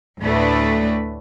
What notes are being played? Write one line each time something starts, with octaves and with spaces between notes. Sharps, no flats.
D2 A2 A3 D4 B4